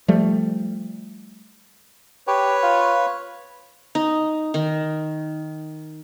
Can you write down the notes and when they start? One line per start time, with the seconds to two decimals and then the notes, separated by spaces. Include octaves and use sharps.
0.08 F3 G3 A3
2.27 G4 B4 C#5
2.63 F4
3.95 D#4
4.54 D#3